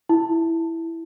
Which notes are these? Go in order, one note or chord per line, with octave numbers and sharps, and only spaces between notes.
E4